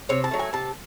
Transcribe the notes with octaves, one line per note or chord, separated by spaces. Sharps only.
C3 C#5
A5
F#3 A3
G#5
C3 A5